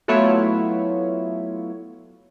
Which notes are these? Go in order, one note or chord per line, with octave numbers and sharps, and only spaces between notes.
F#3 A3 B3 E4 F4 C#5